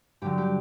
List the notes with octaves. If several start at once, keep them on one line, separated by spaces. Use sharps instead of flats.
G2 D3 F#3 G4
G4